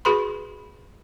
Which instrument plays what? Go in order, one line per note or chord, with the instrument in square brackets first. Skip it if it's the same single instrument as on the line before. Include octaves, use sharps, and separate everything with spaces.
[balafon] F#4 G#4 B4 B5 C6